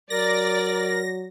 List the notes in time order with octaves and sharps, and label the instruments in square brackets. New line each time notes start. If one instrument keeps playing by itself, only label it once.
[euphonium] F#3 [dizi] A#4 [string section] D5 [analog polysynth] A#6